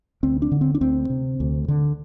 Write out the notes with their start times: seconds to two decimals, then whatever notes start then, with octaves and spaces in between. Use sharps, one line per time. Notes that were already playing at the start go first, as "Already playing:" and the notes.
0.23 D2 C4
0.42 D4
0.51 D3
0.61 C4
0.75 D4
0.81 D2 C4
1.10 C3
1.40 D2
1.68 D3